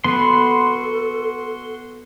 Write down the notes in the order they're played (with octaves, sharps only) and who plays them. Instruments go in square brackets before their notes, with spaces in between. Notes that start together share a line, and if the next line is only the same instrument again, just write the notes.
[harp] B3 [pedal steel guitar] F#4 C6 [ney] A4